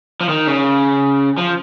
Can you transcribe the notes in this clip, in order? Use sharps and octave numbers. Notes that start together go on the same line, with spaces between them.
F3
D#3
C#3
F3